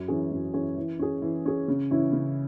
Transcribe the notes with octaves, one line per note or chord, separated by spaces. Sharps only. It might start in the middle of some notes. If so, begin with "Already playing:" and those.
Already playing: F#2
E3 C#4 G#4
F#2
E3 C#4 G#4
E3
C#4 G#4
E3
C#4 G#4
C#3
E3 C#4 E4
C#3